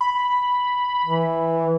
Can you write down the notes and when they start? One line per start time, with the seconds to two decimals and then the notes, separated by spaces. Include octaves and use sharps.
0.01 B5
1.06 E3